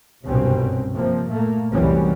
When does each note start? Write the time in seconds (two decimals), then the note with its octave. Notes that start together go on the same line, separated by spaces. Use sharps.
0.25 F#1 C2 G2 B2 C4 C#4
0.93 C3 F3 A#3
1.27 A#2 A3 A#3
1.72 F1 C2 E3 F#3 G3 C#4